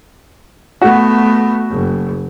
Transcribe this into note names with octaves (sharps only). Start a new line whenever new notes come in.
A3 B3 F#4
F#1